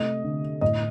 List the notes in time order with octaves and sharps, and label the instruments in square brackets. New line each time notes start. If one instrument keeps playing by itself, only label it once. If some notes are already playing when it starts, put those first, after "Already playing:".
Already playing: [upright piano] C3 A3 D#5
D3
A2 D#5